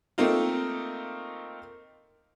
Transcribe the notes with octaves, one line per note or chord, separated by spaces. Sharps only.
A3 A#3 C4 D#4 F4